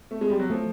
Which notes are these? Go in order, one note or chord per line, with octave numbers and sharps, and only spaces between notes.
A3
G#3
G3
F#3
F3 A3